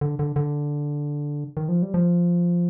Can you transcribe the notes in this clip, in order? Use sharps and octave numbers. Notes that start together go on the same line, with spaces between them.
D3
D3
D3
D#3
F3
G3
F3